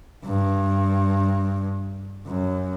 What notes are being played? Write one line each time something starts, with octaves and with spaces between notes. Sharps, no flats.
G2
F#2